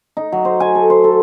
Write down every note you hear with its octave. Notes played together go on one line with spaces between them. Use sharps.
D#4
F#3
C5
G#5
A4
C5
A4